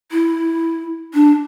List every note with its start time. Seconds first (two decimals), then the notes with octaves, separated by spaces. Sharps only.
0.12 E4
1.14 D4